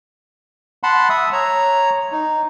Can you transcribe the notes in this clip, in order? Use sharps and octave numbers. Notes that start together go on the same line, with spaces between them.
F#5 A5 B5 C6
E5 D#6 E6
C#5 A#5
D#4